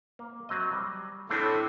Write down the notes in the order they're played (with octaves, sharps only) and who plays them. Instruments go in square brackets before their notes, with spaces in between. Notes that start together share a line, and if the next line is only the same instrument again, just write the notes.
[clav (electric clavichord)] A#3
F#3 C4 D#5
G3
[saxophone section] A2 [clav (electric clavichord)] A3 C4 D4